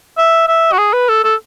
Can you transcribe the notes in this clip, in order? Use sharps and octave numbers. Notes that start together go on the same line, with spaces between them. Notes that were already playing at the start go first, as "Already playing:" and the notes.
E5
E5
F#4
G#4
B4
A4
A4